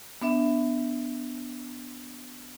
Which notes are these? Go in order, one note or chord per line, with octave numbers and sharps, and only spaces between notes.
B3 D4 E5